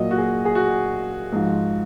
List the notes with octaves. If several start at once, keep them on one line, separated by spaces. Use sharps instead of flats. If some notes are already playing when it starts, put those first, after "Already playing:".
Already playing: A#2 F#3 D#5
F#4
G#4
G#4
F#4
G#2 F3